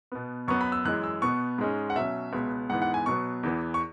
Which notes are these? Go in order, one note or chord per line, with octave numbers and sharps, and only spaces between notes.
B2 B3
F#2 F#3 B3 C#6
B5
E6
F#2 E3 G#3 F#6
E6
B2 B3 C#6
G#2 G#3 C#4
F#5
B2 F#3 C#4 E5
C#2 B2 B3
G#2 E3 B3 F#5
F#5
G#5
B2 F#3 B3 C#6
E2 E3 B3
C#6